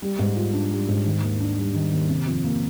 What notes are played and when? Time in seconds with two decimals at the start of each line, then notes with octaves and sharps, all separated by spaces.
0.02 G3
0.19 G#2
0.36 F4
0.53 D4
0.71 G3
0.88 G#2
1.06 D#3
1.23 D#2
1.40 D4
1.58 G3
1.75 D#3
1.92 D#2
2.09 C3
2.27 F2
2.44 A#3